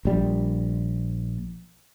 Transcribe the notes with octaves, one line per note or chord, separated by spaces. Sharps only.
A#1 G3